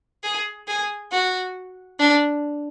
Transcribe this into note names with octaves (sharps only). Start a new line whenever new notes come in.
G#4
G#4
F#4
D4